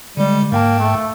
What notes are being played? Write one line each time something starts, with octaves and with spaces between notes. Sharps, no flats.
D3 G3 G#3
G#2 A#3 G5 A5
A3